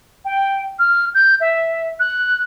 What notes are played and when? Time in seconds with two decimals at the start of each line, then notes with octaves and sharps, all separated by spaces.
0.25 G5
0.79 F6
1.15 G6
1.41 E5
2.00 F#6